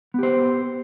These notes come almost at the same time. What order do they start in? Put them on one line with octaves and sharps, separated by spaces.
B3 G4 C5